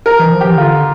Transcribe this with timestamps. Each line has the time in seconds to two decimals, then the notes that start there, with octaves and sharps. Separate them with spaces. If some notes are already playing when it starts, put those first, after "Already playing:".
0.06 A#4
0.19 E3
0.31 F3
0.41 E3 G4
0.57 D3 F4